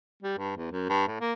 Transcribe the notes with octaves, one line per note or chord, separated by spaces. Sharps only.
G3
G2
E2
F#2
G2
A2
A#3